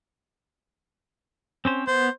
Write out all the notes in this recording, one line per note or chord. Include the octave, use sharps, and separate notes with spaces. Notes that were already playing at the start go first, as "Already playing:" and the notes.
C4 C#4 C5
B3 C5